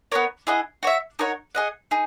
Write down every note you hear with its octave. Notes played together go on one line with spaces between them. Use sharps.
B3 E4 A#4 C#5
E4 G#4 D#5 F#5
F#4 C#5 E5
D#4 A#4 C#5 F#5
G#4 D#5 F#5
D#4 G#4